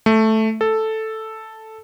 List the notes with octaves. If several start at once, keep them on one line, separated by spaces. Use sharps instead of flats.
A3
A4